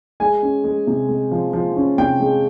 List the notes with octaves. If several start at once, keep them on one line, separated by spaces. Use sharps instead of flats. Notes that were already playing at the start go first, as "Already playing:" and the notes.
G#3 G#5
C#4
G#3
C3
G#3
F3
F3
C#4
C3 G5
G#3